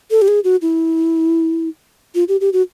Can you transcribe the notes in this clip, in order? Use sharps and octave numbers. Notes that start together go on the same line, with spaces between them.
A4
G4
G#4
F#4
E4
F4
G4
G4
F#4